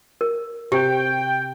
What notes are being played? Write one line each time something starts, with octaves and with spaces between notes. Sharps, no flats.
A#4
C3 G4 G5